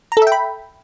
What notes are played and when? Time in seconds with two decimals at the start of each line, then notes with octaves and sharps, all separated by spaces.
0.12 A#5
0.17 A4
0.22 E5
0.27 G5
0.32 B5